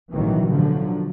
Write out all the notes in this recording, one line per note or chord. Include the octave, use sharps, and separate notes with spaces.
A1 B2 D#3 E3 F#3
D3 F3 F#3